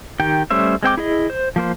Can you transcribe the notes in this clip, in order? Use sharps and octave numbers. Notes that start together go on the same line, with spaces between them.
D#3 G4 G5
G3 A3 C#4 C5 E5
G#3 C4 G5 D6
E4 G#4 D#5
C5
F3 A#3 C5